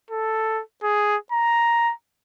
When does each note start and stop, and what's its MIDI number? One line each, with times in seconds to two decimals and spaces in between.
0.10 0.62 69
0.83 1.16 68
1.32 1.93 82